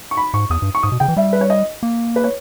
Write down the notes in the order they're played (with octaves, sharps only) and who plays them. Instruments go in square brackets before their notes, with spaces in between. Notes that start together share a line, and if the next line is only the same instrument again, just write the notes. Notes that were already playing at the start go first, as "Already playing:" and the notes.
[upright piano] C#6
B5
[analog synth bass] G#2 [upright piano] C#6
[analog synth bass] E2 [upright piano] D#6
[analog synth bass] G2
[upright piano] C#6
[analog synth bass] G#2 [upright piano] D#6
[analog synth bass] B2
[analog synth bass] C#3 [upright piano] G5
[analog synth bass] E3
[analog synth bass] G3 [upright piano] E5
[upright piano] B4
C#5
D#5
[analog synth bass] A#3
[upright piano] B4
C#5